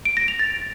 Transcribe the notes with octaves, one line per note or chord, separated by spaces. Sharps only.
D7
A#6
F7
A6